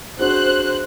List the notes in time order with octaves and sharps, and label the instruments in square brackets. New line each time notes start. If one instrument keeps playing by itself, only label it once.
[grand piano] D4 F#4 G#4 [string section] C5 F#6